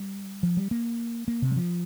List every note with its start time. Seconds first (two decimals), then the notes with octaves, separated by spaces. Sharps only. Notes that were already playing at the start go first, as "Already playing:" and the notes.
Already playing: G3
0.43 F3
0.57 G3
0.71 A#3
1.28 A#3
1.42 C3
1.51 G3
1.56 F3